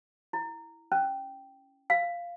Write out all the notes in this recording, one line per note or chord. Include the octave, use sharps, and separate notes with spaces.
E4
C#4
F5